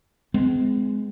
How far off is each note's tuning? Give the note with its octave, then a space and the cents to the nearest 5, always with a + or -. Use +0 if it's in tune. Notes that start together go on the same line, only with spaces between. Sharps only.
G#3 +5 C4 -45